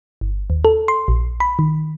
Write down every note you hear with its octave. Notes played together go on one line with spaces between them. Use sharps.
G1
D#2
A4
C6
A#1
B5
D#3